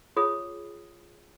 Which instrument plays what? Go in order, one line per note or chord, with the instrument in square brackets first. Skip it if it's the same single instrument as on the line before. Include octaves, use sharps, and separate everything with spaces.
[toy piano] F4 G#4 C#5 B5 D#6